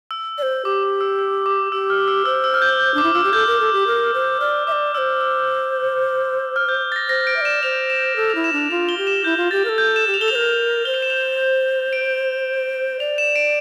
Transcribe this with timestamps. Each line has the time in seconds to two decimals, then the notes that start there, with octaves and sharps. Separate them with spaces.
0.11 E6
0.38 D5
0.42 C5
0.65 G4 D6
0.83 D6
1.01 E6
1.19 E6
1.46 D6
1.72 G4 E6
1.90 F6
2.08 E6
2.25 C5 E6
2.44 E6
2.54 F6
2.62 G6
2.80 G6
2.94 D4 D6
3.04 E4
3.14 F4 E6
3.24 G4
3.33 A4 G6
3.47 A#4
3.60 A4
3.73 G4
3.87 A#4
4.14 C5
4.40 D5 F6
4.67 E5 D6
4.72 D5
4.94 D5 E6
4.98 C5
5.21 E6
6.56 F6
6.69 G6
6.92 A6
6.96 A#6
7.09 C5 A#6
7.27 D7
7.36 E5
7.41 D5 E7
7.63 C5 F7
7.90 E7
8.16 A4
8.30 F7
8.35 E4
8.44 E7
8.53 D4 F7
8.71 F4 F7
8.89 G7
8.98 G4
9.07 E7
9.24 E4 G6
9.37 F4
9.51 G4 A6
9.65 A#4
9.69 A4
9.78 G6
9.96 E7
10.07 G4
10.14 F7
10.20 A4 G7
10.28 C5 F7
10.35 A#4
10.85 C5 G7
10.94 F7
11.02 E7
11.10 F7
11.93 D7
13.00 D5 F7
13.18 E7
13.36 D7